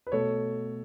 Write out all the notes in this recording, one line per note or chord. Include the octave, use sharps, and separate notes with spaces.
B4
B2 A3 A4 C#5